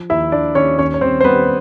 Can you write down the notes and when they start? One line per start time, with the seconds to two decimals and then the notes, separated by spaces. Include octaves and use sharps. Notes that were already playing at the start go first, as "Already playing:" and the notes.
Already playing: F3
0.10 D#2 E4 E5
0.32 D#2 D4 D5
0.55 D#2 C#4 C#5
0.78 D#2 C#4 C#5
0.94 C#5
1.01 G3 C4 C5
1.21 C5
1.24 G3 B3 B4